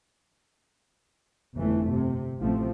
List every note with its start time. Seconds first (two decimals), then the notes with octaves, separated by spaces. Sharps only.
1.57 G1 F2 E3 A3
1.91 C3
2.39 A1 F3 A3 C4